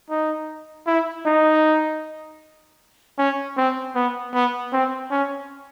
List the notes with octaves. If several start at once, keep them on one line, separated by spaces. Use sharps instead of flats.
D#4
E4
D#4
C#4
C4
B3
B3
C4
C#4